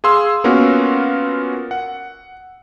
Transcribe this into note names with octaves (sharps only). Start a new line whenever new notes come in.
G#4 F5 C6 E6
A#3 B3 C#4 F4 F#4 A#4
F#5